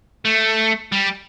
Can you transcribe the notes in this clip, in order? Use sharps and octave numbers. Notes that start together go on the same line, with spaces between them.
A3
G3